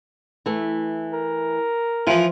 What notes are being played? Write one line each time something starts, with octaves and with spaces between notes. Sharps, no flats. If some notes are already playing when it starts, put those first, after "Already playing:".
E3 A3
A#4
E3 F3 F4